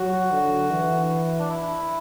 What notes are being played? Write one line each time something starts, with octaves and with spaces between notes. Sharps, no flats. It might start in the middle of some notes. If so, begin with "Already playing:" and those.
Already playing: F#3 F#4
D3
E3
D4
E4